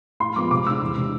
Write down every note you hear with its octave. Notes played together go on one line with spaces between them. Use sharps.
A2 C6
F3 G#3 B3 D6
C3 D6
G#3 D4 E6
E2
C3 G#3 D4